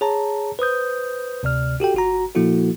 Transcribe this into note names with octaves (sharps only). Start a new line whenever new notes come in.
G#4 C#5 A5 A#5
B4 C5 D#6 G6
D2 C3 D5 F6
F#4 G4 A4 G5
G1 F#4 A#5
A#2 F3 A#3 E4 F#4 A4